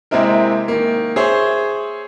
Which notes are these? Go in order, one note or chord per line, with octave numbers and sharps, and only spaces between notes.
C3 G#3 A#3 C4 E4 A#4
D#3 A#3
G#4 C5 C#5 E5